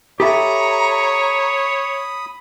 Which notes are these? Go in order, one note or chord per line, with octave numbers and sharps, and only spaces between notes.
G4 A4 C#5 E5 A#5 B5 D#6